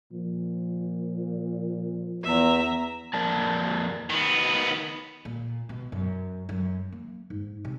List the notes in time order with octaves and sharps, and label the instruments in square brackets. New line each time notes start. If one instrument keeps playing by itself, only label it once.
[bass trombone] A#2 [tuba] F3
[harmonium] E2 [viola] E5 A#5
[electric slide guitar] F2 A#3 D5 A5
[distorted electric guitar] D#3 B3
[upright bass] A#2
B2
F#2
F#2
A#3
G#2
C3